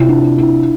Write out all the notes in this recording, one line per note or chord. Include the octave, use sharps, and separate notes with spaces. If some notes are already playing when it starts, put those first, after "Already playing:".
Already playing: C3 E4 F4
D4
E4